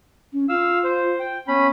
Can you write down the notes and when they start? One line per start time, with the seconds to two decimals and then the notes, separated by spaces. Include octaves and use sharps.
0.33 C#4
0.49 F4 F5 E6
0.84 C5
1.20 G5
1.48 B3 C#4 B5